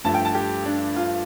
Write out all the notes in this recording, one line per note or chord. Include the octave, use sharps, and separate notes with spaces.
G2 F3 A3 A5
G5
A5
G4
D4
F4